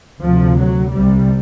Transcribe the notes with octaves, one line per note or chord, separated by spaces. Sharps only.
D2 C3 F3
F#3
C2 C3 G3